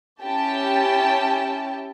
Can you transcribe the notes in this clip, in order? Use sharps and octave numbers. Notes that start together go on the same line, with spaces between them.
C#4 E4 G4 G5 A5